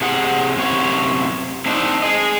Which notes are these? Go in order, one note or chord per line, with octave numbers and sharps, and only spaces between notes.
C3 G#4 F#5
F#2 C3 C#5
C4 D4 D#4
G#4 D#5